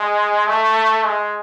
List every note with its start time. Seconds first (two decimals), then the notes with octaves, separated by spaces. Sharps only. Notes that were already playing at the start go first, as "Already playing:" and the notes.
Already playing: G#3
0.47 A3
1.05 G#3